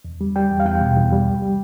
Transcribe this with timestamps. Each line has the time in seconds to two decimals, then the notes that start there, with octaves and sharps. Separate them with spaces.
0.05 E2
0.21 G3
0.36 G3 G5
0.50 E2
0.60 F5
0.66 E2 G5
0.81 B2
0.97 E2
1.12 G3
1.27 C2
1.42 G3